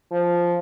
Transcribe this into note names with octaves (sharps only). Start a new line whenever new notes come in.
F3